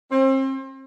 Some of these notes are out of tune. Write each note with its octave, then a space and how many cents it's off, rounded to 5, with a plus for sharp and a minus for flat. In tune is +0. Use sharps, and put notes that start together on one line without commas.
C4 +35